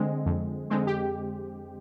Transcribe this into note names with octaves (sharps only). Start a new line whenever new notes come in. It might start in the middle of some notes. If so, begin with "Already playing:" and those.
Already playing: D3 G#3 C4
F2
D3 G#3 C4
G4